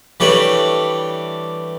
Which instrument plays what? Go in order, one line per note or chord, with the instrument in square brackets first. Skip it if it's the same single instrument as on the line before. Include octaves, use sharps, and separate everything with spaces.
[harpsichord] E3 G3 A3 D4 B4 C#5